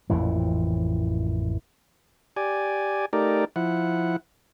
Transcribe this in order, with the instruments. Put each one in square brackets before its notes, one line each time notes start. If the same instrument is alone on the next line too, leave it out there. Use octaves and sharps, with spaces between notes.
[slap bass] A1 F2 A#2 E3
[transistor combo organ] G4 D5 G#5
A3 D#4 G4 A#4 D5
F3 E4 F#5